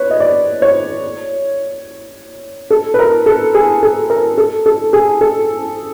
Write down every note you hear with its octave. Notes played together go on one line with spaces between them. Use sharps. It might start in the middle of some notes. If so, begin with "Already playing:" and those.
Already playing: B4 C#5
D#5
D5
C#5
A4
B4
A#4
A4
G#4
A4
A#4
A4
A4
G#4
A4